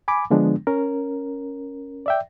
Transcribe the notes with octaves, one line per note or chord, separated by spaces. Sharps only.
G#5 B5 D6
D3 F3 G#3 B3 D4
C#4 A#4
D5 E5 G5